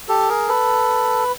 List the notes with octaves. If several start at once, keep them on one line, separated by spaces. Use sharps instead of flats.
G4 A4
G#4 A#4
A4 B4